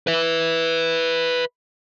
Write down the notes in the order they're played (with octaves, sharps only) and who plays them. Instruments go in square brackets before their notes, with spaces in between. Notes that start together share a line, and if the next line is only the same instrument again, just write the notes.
[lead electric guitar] B4 E5